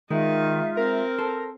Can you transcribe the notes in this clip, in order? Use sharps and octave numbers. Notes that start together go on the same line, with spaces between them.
D#3 G#3 D#4 F4 E5
C4 A#4
A4 C5